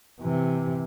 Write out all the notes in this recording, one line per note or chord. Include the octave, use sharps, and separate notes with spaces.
C3 E3